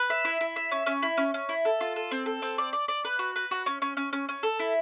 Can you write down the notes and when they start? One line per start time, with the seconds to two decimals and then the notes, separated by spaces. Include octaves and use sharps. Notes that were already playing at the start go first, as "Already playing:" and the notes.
Already playing: B4
0.10 E5
0.25 E4
0.41 E4
0.56 E5
0.71 C#4
0.86 C#4
1.02 E4
1.17 C#4
1.34 C#4
1.49 E4
1.65 A4
1.81 F4
1.96 A4
2.11 C4
2.26 A4
2.42 C4
2.58 D5
2.73 D5
2.88 D5
3.05 B4
3.19 F#4
3.36 B4
3.51 F#4
3.66 C#4
3.82 C#4
3.97 C#4
4.13 C#4
4.29 C#4
4.43 A4
4.59 E4